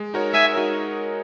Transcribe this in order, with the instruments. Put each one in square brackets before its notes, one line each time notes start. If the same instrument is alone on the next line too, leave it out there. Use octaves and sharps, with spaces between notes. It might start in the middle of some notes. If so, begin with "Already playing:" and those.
Already playing: [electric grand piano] G#3
D#4 F#4 A#4 C#5
[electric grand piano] G#3 [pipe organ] E5 G#5
[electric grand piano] D#4 F#4 A#4 C#5